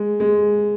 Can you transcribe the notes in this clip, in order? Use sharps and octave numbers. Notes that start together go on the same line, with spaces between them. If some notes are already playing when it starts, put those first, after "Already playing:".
Already playing: G#3
G#3